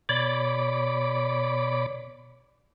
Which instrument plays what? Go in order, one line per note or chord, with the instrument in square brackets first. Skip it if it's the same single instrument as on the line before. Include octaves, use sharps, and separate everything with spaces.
[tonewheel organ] B2 C#5 D5 B5 D6